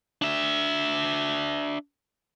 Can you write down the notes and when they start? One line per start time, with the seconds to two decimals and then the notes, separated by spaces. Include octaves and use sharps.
0.22 D4 E5